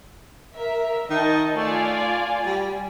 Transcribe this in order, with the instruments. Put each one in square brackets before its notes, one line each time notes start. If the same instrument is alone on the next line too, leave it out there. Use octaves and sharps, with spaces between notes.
[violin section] A#4 E5
[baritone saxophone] D#3 [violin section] D#5 A5
[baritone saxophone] A3 [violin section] F4 D5 G#5
[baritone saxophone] G3